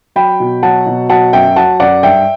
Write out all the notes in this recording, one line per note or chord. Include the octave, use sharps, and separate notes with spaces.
F#3 G5 B5
B2
F#3 F#5 A5
B2
F#3 F#5 A5
F#2 E5 G5
F#3 F#5 A5
F#2 D5 F#5
G2 E5 G5